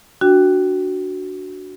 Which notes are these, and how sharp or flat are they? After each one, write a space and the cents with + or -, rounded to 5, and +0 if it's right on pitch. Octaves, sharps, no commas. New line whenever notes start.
D4 +0 F#4 +0 G5 +0